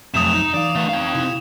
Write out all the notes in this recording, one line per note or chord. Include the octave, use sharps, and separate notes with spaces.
F2 C3 F3 F#3 A3 D#6 E7
D#4
E3 D#4 D5 F5
A3 B3
C4 D#4 F5 G5
C3 E4